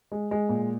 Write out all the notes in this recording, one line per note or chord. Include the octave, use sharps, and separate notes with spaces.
G#3
G#3
A#2